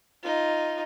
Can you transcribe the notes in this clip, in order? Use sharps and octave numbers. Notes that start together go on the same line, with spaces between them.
D#4 F4